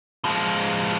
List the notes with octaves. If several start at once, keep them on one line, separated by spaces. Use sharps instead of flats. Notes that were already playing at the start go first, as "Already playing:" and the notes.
F3 G#3